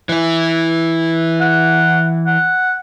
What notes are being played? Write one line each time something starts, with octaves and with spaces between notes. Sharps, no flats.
E3 E4
F#5
F#5